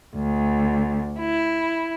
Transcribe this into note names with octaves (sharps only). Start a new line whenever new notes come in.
D2
E4